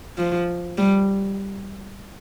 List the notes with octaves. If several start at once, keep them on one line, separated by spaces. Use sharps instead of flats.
F3
G3